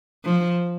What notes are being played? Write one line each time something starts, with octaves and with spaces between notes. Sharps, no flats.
F3